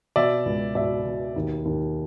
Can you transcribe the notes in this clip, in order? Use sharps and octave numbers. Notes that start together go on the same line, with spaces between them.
B2 D5 E5
C#2
B2 D5 E5
B2
D#2
D#2